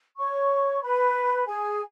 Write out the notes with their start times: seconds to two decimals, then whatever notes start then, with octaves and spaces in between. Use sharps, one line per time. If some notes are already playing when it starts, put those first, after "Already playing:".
0.18 C#5 C#6
0.81 B4 B5
1.46 G#4 G#5